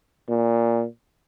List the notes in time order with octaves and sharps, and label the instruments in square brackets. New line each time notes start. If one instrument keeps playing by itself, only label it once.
[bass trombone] A#2